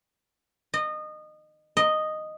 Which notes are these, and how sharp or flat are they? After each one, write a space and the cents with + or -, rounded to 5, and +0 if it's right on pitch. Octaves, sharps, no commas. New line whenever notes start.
D#5 -25
D#5 -5